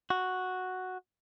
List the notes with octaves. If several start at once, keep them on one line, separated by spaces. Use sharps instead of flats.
F#4